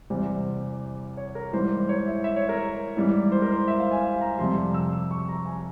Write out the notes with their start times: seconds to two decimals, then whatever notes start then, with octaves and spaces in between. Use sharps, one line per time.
0.10 E2 C3 G3 C5
1.17 C#5
1.35 A#4
1.53 G#2 E3 G3 C5
1.89 C#5
2.07 E5
2.24 E5
2.36 C#5
2.49 A#4
2.97 G#2 E3 G3
3.32 C5
3.42 A#4
3.52 C5
3.68 E5
3.80 F5
3.91 G#5
4.03 F5
4.21 A#5
4.38 F2 C3 G3 C6
4.74 E6
4.93 E6
5.11 C#6
5.29 A#5
5.46 G#5